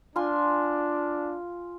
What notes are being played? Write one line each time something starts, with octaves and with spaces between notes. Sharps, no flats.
D4 F4 G#5 C6